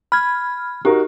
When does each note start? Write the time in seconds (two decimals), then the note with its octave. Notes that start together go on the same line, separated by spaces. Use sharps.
0.12 B5 F6 G#6
0.85 D#4 F#4 G4 A#4